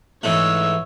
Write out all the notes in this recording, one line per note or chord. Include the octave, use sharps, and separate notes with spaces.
G#2 E3 A3 C#5 E6